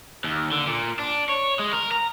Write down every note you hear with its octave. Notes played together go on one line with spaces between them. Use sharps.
D#2
D3
A#2
D4
C#5
G#3
A#4
A#5